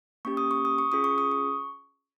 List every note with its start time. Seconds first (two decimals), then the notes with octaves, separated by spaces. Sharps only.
0.25 A#3 C#4 G4 C#6
0.37 D#6
0.51 C#6
0.65 D#6
0.78 C#6
0.92 C#4 F4 G#4 D#6
1.04 C#6
1.18 D#6
1.31 C#6